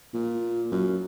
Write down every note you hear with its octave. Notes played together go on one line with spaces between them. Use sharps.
A#2
F#2